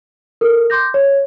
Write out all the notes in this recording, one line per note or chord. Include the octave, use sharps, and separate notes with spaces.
A4 A#4
C6 D6 G6 A#6
C#5